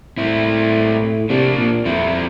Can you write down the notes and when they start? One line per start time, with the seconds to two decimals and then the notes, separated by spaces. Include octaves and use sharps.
0.18 A2 C4 E4
1.30 C3 A#3 D4
1.58 A#2
1.85 F2 C4 E4